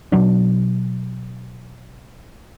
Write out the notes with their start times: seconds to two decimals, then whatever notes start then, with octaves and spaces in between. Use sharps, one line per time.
0.12 B2 F#3 D4